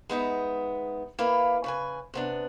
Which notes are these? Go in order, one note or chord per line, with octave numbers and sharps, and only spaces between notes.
G#3 B3 D#4 E5
A#3 E4 B4 F5
C#3 B4 G#5
C3 B3 D4